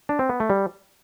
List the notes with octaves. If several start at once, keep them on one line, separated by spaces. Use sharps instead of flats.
D4
C4
B3
A3
G3